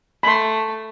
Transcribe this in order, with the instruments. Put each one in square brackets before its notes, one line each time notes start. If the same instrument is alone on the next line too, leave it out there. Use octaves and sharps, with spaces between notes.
[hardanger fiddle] A3 [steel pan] B5 C6